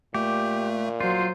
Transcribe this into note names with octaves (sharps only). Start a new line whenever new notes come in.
A#2 A3 G4
F#3 F4 C5